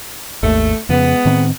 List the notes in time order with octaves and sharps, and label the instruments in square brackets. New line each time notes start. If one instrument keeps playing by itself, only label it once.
[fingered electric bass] G#1 D#2 [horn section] A3
[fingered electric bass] F2 C#3 [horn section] G#3 B3
[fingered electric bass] A2 D#3 C4